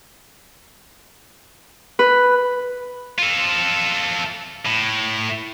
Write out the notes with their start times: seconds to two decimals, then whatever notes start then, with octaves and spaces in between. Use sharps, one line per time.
1.99 B4
3.19 F4 A4
4.66 A2